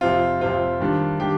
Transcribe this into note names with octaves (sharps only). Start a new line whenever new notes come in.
F2 C3 F3 C4 F4
F2 C3 F3 C4 F4
D#3 G3 D4 G4
D#3 G3 D4 G4